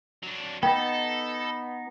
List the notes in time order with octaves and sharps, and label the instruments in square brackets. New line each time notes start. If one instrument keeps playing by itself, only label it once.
[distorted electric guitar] F#3 D4
[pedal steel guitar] B3 D#4 [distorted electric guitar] A4 [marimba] G5